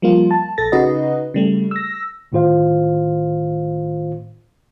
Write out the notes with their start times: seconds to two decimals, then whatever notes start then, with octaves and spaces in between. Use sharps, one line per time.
0.02 F3 G3 A#3 F4
0.31 A5
0.58 A#1 A4 A6 A#6
0.72 C#3 D#4 F#4 B4 D#5
1.34 C#3 G3 A3
1.71 E6 A#6
2.32 G1 A2 D#3 F4 C5 F5